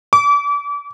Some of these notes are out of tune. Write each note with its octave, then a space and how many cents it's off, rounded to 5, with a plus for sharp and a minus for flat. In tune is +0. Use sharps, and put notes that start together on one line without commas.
D6 -35